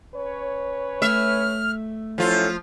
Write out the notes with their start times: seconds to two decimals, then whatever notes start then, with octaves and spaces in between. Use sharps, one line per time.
0.15 C#4 B4 C#5
1.02 A3 E5 F6
2.18 F3 F#3 C#4 E4 F4 A4